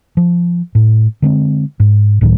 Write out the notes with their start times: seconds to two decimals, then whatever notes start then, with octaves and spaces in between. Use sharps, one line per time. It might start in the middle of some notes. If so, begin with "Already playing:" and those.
0.17 F3
0.75 A2
1.22 D3 G#3 C4
1.80 G#2
2.21 C#2 A2 D#3 F#3